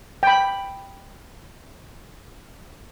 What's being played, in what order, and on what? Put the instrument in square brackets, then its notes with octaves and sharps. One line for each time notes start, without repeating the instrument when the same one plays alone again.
[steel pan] G5 B5